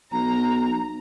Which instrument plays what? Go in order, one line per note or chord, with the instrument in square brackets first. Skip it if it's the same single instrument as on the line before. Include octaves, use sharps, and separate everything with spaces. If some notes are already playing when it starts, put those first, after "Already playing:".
[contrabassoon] B1 [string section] A#5